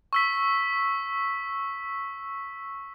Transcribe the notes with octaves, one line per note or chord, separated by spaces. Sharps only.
C#6 E6 B6